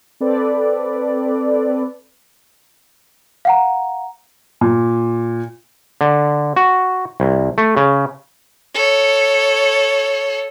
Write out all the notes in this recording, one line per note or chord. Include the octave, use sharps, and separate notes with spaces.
C4 A4 B4 D5
F5 F#5 A#5
A#2
D3
F#4
C2
A3
C#3
A4 C#5